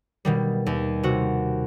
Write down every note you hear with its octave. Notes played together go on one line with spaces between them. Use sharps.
B2 D#3 G3
D#2
C3 F#4